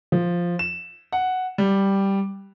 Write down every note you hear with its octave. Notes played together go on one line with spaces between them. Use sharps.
F3
E7
F#5
G3